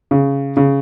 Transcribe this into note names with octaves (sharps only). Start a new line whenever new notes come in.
C#3
C#3